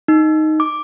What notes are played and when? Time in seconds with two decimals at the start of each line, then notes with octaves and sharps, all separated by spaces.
0.08 D#4
0.60 D6